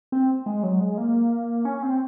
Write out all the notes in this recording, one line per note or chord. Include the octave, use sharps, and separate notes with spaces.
C4
G#3
F#3
G#3
A#3
C#4
C4